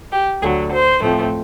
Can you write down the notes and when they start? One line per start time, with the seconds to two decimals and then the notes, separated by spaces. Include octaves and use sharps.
0.13 G4
0.42 D2 D3 F#3 G#4
0.71 C5
1.01 A2 F3 A3 C4